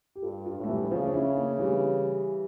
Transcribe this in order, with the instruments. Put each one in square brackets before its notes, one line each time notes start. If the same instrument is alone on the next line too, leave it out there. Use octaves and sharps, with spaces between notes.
[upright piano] G4
[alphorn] G2 [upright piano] F4 A4
[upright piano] D4 F4
[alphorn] A2
[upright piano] A3
E3 G3
[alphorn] C#3 [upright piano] F3
[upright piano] D4
C#4 E4
A#3 D4
E3 G3